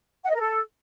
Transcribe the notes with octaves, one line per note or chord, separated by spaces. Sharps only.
F#5
D#5
A#4
A4